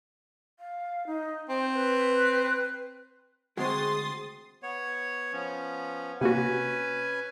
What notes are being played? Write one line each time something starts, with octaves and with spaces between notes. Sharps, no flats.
F5
D#4
C4 C5
B4
D2 G#3 C4 F#4 G#4 C6 D#6 A6
B3 C#5
F3 B3 C#4
C3 A#3 C#4 F#4 B4 G#5